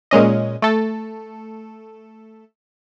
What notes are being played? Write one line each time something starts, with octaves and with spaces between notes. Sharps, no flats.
A#2 G#3 C#4 D#5
A3 A4